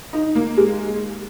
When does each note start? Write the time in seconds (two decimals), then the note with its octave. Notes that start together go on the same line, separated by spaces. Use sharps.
0.13 D#4
0.35 A#3
0.57 G#3